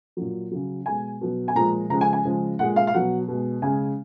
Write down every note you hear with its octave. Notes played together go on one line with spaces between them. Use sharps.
A#2 F#3
C#3 F#3
B2 G#3 G#5
B2 F#3
G#5
A#2 F3 G#3 A#5
C#3 F3 G#3 A#5
G#5
G#5
C#3 F3 G#3
A#2 G#3 F#5
F5
F5
B2 F#3 F#5
B2 G#3
C#3 G#3 G#5